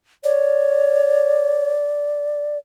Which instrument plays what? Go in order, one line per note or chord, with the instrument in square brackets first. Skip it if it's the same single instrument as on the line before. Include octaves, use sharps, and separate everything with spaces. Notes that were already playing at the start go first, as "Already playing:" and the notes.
[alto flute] C#5 [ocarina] D5